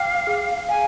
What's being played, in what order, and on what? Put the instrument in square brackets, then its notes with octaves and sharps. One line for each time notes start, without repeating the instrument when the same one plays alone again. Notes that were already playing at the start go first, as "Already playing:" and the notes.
Already playing: [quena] F5 [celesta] G5 D6
[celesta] G#4
[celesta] F5 [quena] G#5